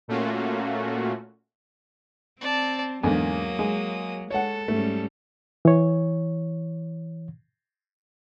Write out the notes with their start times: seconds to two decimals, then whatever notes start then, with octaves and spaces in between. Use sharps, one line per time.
0.08 A#2 A3 A#3 C#4 F4 F#4
2.41 C4 D5 A5
3.04 E2 G#2 D3 F#3 A#3 D#6
3.59 G#3
4.30 G#3 A4 C#5 F#5
4.68 G#2 G3 A3 C#4
5.65 E3 C#5